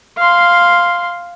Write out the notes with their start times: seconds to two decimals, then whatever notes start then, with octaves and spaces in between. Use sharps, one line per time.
0.18 F5 C6